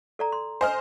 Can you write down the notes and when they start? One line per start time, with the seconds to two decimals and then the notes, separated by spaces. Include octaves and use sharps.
0.19 A4 D5 A#5
0.32 C6
0.61 C5 D#5 G#5 F6